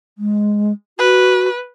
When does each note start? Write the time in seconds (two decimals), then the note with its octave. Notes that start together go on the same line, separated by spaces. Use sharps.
0.18 G#3
0.99 F#4 B4